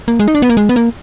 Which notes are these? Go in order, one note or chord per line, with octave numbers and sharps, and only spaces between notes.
A#3
G#3
D#4
D4
B3
A#3
G#3
B3
A#3